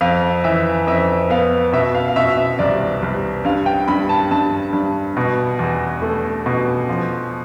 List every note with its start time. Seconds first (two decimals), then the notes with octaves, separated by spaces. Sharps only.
0.01 F2 F5
0.44 E3 E5
0.87 F2 E5
1.30 B3 F5
1.73 B2 E5
1.95 F5
2.08 F5
2.16 B2 E5
2.37 E5
2.59 C2 D5
3.03 C2
3.45 G2 F5
3.66 G5
3.88 G2 B5
4.09 A5
4.31 G2 A5
4.73 G2
5.17 B2
5.59 E2
6.02 A3
6.46 B2
6.89 F3